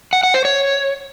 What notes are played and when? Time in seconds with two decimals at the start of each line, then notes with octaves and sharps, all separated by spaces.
0.13 F#5
0.23 F#5
0.34 C5
0.45 C#5